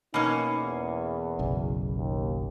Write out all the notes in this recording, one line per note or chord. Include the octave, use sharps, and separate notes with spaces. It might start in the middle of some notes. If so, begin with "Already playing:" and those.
B2 A#3 C#4 D#4
E2
F#1 B1 C#3
D#2